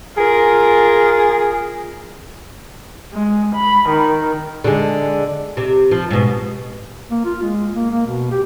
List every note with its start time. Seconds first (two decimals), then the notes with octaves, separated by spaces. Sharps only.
0.18 F4 G#4 A#4
3.14 G#3
3.55 B5
3.89 D#3
4.64 D3 G#3
5.57 C3
5.91 F3
6.11 G#2 B2
7.11 A#3
7.25 F4
7.42 G#3
7.74 A#3
7.91 A#3
8.07 B2
8.31 G4